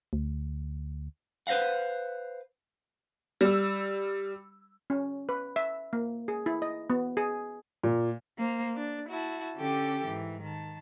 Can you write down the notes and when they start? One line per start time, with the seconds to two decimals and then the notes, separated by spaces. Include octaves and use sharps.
0.13 D2
1.47 B4 C5 D#5 F5 F#5
3.41 G3 E6
4.90 C#4
5.29 B4
5.56 E5
5.93 A#3
6.28 G#4
6.46 E4
6.62 D#5
6.90 B3
7.17 G#4
7.83 A#2
8.38 A#3 C5
8.75 D4
9.08 E4 F#4 A5
9.56 D3 C#4 G4 A4 G5 D6
10.04 G#2 E3
10.42 D#3 A5